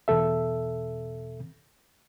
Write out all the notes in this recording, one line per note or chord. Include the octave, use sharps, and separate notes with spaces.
E2 B2 A4 E5